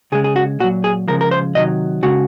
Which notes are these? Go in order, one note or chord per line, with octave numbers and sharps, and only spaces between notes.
C#3 G#3 G#4
G#4
F#4
A#2 F#3 F#4
G#4
C#3 F3 G#3 A#4
A#4
C5
C3 D#3 F#3 D#5
C#3 G#3 F#4